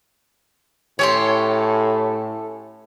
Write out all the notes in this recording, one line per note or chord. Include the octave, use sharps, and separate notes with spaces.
A2 C#4 G4 A4 C#5 C6